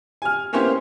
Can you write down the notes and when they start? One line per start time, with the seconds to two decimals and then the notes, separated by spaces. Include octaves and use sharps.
0.22 G#5 F6
0.53 A#3 B3 C#4 E4 G4 C5